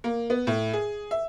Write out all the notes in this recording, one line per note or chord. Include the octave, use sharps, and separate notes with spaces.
A#3
B3
A2
G#4
E5